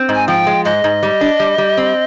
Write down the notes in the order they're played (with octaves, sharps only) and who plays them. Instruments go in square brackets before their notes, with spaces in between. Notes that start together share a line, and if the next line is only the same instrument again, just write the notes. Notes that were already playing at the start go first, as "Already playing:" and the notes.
Already playing: [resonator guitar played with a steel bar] C4
G#2
[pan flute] G#5
[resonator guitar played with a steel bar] F3 [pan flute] G5
[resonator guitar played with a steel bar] G#3
[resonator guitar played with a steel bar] G#2 [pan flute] D#5
[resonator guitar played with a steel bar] G#2
G3
D4
G3
G3
C4